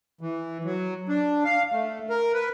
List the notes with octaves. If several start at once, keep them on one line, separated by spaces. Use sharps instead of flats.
E3
F#3
D4
F5
A3
A#4
B4